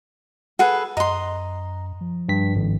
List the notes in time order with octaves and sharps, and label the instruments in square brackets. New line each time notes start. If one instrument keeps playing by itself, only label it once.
[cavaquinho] G#4 A4 B4 [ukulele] F#5
[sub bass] F#2 [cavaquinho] D#5 C6 [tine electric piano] A#5
[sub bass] F3
[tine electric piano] G2 B6
G#1